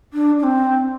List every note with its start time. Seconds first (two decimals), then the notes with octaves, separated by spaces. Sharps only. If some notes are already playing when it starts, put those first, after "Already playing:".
0.13 D4
0.39 D4
0.43 C4